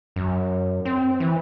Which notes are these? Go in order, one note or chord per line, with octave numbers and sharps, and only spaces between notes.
F#2
C4
E3